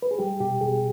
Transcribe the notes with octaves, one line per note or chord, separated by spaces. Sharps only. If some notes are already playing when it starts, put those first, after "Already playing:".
B4
G#4
G3 G4
B2 G4
B2 G#4